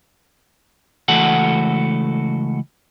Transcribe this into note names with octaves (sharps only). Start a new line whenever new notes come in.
C#2 E3 A3 F#4 A4 F#5